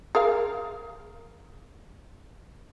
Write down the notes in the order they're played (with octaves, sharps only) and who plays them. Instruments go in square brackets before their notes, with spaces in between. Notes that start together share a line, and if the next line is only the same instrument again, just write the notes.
[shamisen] G#4 A#4 F5